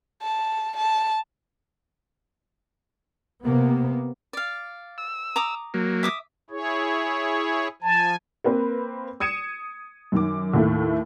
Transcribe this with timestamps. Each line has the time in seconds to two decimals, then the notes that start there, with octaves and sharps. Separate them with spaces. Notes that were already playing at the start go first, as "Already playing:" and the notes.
0.23 A5
0.77 A5
3.43 C3 A#3 B3
4.33 D5 F5
4.98 E6
5.36 A#5 D6 D#6
5.74 F#3 A#3
6.03 E5 D6 D#6
6.50 E4 G#4 C#5
7.82 F3 G#5 A5
8.44 A#3 C4 B4
9.20 D#6 G#6 C#7 D#7 E7
10.12 F#2 D#3 D6
10.54 D#2 A2 A3